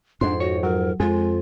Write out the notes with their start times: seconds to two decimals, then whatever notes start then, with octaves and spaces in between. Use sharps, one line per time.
0.21 F2 G#2 D4 C6
0.40 F#4 C#5
0.63 F#3 A#4
1.00 F2 G#3 F4